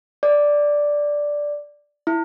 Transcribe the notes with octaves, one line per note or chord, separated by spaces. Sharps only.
D5
E4